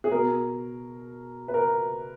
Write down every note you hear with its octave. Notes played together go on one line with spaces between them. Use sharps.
G#4
B2 A#4
B4
A#4